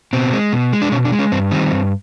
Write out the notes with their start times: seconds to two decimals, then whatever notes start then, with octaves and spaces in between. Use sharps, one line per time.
0.13 B2 C4
0.33 G#3
0.52 B2
0.73 G#3
0.82 D4
0.92 B2 C#4
1.05 D4
1.12 G#3
1.19 C#4
1.32 G2 C4
1.51 D#3 G3 C4
1.72 G2